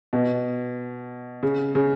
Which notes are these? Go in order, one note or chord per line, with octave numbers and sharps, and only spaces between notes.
B2
C#3
C#3